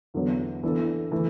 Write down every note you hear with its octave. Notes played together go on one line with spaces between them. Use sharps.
E2 D3 F#3 B3
E3 B3 D4 A4
E3 A3